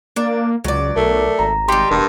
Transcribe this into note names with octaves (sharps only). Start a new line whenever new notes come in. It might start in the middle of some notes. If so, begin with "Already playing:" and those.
A#3 D4 D5
C#2 F#3 D5
B1 A3 A#4
G#1 A#5
G3 D#4 G4 C6
E1 G2 A#4